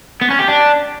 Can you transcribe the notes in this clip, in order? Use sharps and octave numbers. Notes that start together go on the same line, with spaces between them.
B3
C#4
G4
D4